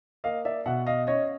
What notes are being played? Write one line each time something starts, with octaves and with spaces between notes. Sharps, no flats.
A#3 D#5 F5
D5 E5
B2 E5 F#5
D#5 F5
C#4 C#5 D#5